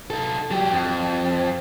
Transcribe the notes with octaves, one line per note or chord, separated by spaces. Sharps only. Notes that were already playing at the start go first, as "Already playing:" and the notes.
D#4 A4
F#3 G4
F2